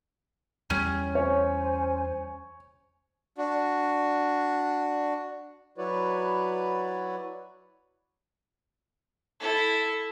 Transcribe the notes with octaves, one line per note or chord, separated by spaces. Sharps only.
E2 G3 C#4
C5 C#5 G#5
D4 F#4
F#3 E4 F#4 B4 C#5 D5
E4 A4